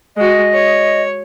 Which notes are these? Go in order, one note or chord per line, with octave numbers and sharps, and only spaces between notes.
G#3 F#4 D#5
C#5